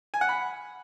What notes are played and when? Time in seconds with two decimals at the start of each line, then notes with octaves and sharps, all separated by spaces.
0.14 G#5
0.21 F#5
0.29 B5